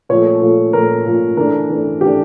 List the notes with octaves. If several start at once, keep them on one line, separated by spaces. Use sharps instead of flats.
A#2 F3 A3 C#5
A#2 F3 A3
A#2 F3 A3 A#4
A#2 F3 A3
E3 A3 D4 A#4
E3 A3 D4
E3 A3 D4 G4